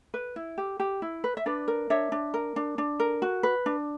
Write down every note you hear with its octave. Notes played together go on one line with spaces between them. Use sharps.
B4
E4
G4
G4
E4
B4
E5
D4 B4 D5
A#4
D4 C#5 E5
D4
A#4
D4
D4
A#4
F#4
B4
D4